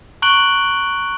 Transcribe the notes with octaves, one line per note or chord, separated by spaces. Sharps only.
A#5 C#6 F#6 D7 F#7 G7